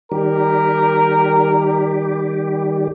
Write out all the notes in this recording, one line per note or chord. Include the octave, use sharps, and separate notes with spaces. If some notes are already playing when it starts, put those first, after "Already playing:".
D#3 G3 G4 A#4